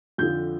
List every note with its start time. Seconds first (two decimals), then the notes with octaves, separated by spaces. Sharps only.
0.18 F2 D3 F3 G6